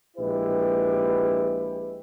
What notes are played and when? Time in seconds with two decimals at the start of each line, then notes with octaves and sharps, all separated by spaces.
0.17 A#1 G#3 E4 G4 B4